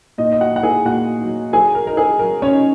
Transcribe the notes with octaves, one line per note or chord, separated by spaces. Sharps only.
A#2 D#4 D#5
D#5
F#4 F#5
F#3 D#4 F#5
G#4 G#5
A#2 F#4 F#5
F#3 D#4
F#3 G#4 G#5
A#4
D#4 A#4
G#4
F#3 A#4
C#4 C#5
D#4